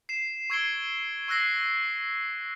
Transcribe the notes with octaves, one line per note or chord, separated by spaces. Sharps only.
C7 E7
C#6 E6 G#6 C7 D7 G7
C#6 E6 F#6 A#6 C7